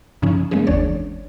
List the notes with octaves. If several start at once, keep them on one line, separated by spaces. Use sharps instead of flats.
G2 C#3 F3 C#4 D#4
G#3 A#3 C4 C#4 G#4
G1 D#2 E3 D4 C#5 D5